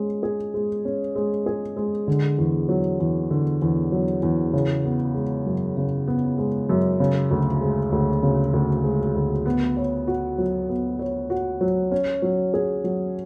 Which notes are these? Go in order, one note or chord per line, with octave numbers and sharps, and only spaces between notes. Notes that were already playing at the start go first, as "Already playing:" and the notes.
Already playing: G#3 C#4
G#4
G#3
C#4
G#3
G#4
G#3
D3
E2
F#3
E2
D3
E2
F#3
E2
C#3
B3
G#3
F#2
C#3
B3
G#3
F#2
C#3
D2
G#3
D2
C#3
D2
G#3
D2
B3
C#5
F#4
F#3
B3
C#5
F#4
F#3
C#4
F#3
G#4
F#3